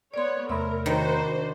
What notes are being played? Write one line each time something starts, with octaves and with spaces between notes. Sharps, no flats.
B3 C#5 D5 C6
E2 C3 A3 A#4 E5 B5 C6
D#3 D4 F#4 C5 C#5 A#5